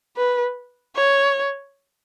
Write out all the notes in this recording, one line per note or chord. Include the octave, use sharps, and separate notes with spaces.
B4
C#5